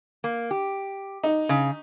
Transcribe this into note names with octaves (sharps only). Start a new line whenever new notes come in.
A#3
G4
D#4
C#3